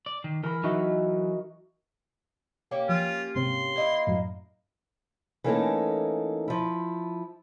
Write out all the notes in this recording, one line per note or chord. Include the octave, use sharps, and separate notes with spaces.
D5
D#3
E3 A#4 B5
E3 F#3 D#4 F#4 E5
A#3 C#4 G4
F3 F4
G#2 C3 C4 C6
A#3 D#4 E4
F#2 A2
E3 A3 A#3 C#4 D#4 A4
F3 E4